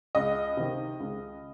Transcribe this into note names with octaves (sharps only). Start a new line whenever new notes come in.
C#2 D#5
C3 D#3
C#2